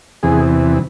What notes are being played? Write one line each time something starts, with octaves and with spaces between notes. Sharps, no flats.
E2 C3 E3 G#4